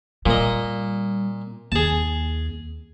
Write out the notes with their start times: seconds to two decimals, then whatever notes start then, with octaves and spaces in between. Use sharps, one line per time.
0.26 A#2 G3 D#5
1.72 D#2 G#4 A5